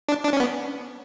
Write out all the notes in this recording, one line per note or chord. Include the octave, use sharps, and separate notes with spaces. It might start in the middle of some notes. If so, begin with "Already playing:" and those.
D4
D4
C#4
B3